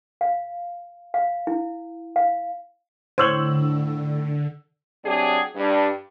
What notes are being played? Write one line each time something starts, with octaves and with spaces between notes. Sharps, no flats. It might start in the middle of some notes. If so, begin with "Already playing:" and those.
F5
F5
E4
F5
A2 D3 C5 C#5 E6 F#7
C3 F#3 D4 G4 G#4
G2 D4